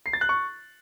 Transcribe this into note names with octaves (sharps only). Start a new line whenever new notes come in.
C7
A6
F#6
C#6